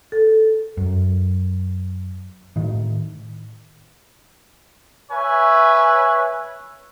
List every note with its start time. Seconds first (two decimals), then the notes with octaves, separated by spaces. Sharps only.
0.12 A4
0.77 F#2
2.56 A2 D#3
5.12 B4 C#5 E5 G#5